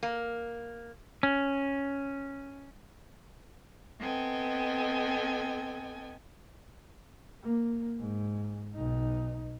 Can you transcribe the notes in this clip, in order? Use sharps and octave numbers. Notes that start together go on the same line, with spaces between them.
A#3
C#4
B3 C4 A4 D#5 G5 G#5
A#3
G#2
B1 D#4